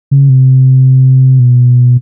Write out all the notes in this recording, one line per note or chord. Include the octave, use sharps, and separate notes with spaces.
C#3
C3
B2